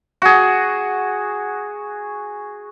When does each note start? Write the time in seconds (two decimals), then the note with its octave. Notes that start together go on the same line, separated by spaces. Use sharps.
0.22 F#4 G#4